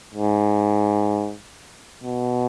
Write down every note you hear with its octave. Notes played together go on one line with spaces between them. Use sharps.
G#2
B2